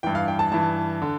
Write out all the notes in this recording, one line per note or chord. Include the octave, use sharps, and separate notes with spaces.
G2 E3 G5
F5
G5
A5
G2 E3 A5
D3